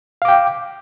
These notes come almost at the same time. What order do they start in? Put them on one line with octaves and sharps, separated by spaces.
F5 D6 G5